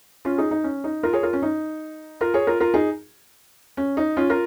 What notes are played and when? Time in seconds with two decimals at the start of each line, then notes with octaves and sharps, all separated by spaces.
0.25 C#4 F4
0.38 D#4 G#4
0.51 D#4
0.64 C#4
0.84 D#4
1.03 F4 A#4
1.13 G#4 C#5
1.23 F4 A#4
1.33 C#4
1.42 D#4
2.21 F4 A#4
2.34 G#4 C#5
2.47 F4 A#4
2.60 F4 A#4
2.74 D#4 G#4
3.77 C#4
3.97 D#4
4.17 C#4 F4
4.30 F4 A#4